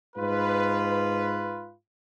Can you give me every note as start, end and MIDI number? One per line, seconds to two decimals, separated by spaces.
0.17 1.72 44
0.17 1.72 65
0.17 1.72 71